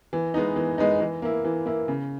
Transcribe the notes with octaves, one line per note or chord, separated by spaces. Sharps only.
E3
G#3 B3 D#4
E3
G#3 B3 D#4
E3
A#3 E4
E3
A#3 E4
C#3